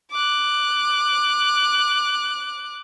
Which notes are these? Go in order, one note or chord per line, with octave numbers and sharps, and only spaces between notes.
D6 F#6